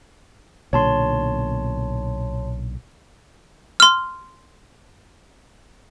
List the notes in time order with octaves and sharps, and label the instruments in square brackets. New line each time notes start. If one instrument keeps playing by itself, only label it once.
[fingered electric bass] B1 A#2 D3 [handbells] C#5 A5 C6
[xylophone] C6 F6